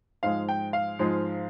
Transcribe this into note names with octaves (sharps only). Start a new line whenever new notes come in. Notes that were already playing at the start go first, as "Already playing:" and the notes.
G#2 F3 G#3 F5
G5
F5
G#2 F3 G#3